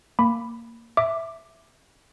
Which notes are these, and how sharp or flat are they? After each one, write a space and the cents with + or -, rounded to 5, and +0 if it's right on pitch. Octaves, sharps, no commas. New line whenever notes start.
A#3 -10 B5 +5 D6 +0
E5 +0 D6 +5